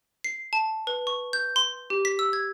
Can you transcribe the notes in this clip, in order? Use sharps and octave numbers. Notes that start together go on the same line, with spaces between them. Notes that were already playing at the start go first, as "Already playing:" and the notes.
C7
A5
B4
C#6
G6
C6
G4
B6
E6
G#6